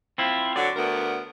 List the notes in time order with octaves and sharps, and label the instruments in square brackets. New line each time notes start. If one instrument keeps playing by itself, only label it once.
[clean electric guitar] C4 E4 F4
[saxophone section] D3 F#3 F#4 [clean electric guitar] D5
[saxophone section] D2 B3 A#4